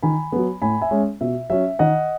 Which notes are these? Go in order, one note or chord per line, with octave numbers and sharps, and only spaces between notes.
D#3 G#5 B5
F#3 B3
A2 G#5 B5
E5 G#5
G#3 C#4
B2 E5
F#3 C#4 E5
D#3 D#5 F#5